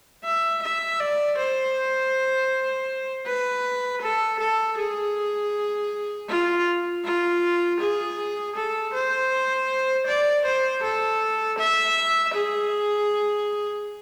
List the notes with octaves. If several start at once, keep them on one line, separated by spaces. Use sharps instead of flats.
E5
E5
D5
C5
B4
A4
A4
G#4
F4
F4
G#4
A4
C5
D5
C5
A4
E5
G#4